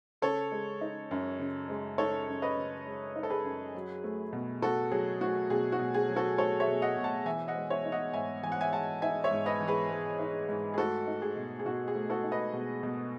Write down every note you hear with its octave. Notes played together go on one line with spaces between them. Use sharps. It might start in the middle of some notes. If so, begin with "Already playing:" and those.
C#3 A4 C#5
G#3
D#4
F#2
C#3
G#3
D#4 A4 C#5
F#2
B4 D#5
C#3
G#3
D#4
A4
G#4 B4
F#2
F#3
A3
B2
B2 F#4 A4
F#3 G#4
A3 F#4
B2 G#4
F#4
B2
G#4
F#3
F#4 A4
A3 A4 C#5
C#5 E5
B2
D#5 F#5
B2
F#5 A5
E3 E5 G#5
D#5 F#5
G#3
C#5 E5
D#4
D#5 F#5
G#2 E5 G#5
E3 G#5
F#5
E5 G#5
G#3 F#5 A5
D#4 E5 G#5
C#5 E5
G#2
B4 D#5
E3
G#4 B4
G#3
D#4
G#2
G#4
A3 F#4 A4
D#4
G#4
B2
G#4
B2 F#4
G#4
A3
F#4 A4
D#4
B4 D#5
B2
B2